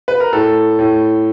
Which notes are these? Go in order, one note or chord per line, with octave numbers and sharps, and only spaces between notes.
B4
A#4
A2 A4
A2